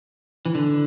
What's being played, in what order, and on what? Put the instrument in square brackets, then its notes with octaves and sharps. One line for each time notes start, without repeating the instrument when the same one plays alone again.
[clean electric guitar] E3
D3